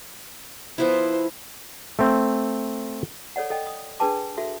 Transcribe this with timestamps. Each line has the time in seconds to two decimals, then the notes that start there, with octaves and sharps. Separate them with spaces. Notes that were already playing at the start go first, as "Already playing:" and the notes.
0.78 F3 B3 E4 C5
1.99 A3 C4
3.36 A4 C#5 D5 F#5
3.50 A4 D#5 G5
3.67 D#6
4.00 D4 G#4 B4 G5 A5 D6
4.37 F#4 A4 E5